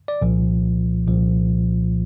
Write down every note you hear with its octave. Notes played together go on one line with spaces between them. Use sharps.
D5
C2 A#2 F3
C2 A#2 F3